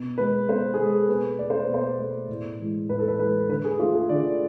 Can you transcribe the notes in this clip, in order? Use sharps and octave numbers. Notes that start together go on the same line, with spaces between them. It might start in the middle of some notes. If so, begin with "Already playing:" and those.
Already playing: B2
G#3 B4
B2 C5
G#4
G#3 A4
B2 B4
A3 D5
C5
B4
B2
C5
A3
A2
E3 G#3
A2 B4
A4
B4
E3 G#3 B4
D3 B4
G#4
A3 F4
G#4
D3 D5